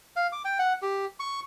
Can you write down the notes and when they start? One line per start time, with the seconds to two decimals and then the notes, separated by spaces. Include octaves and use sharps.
0.16 F5
0.32 D6
0.45 G5
0.59 F#5
0.82 G4
1.20 C#6